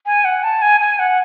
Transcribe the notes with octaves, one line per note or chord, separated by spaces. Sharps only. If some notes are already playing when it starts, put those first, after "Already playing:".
G#5
F#5
A5
G#5
G#5
F#5